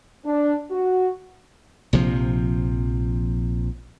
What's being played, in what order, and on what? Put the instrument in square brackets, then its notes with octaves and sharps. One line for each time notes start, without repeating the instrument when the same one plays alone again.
[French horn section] D4
F#4
[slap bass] A#1 C3 F3